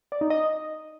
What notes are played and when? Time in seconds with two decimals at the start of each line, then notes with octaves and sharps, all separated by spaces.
0.12 D5
0.21 D#4
0.30 D#5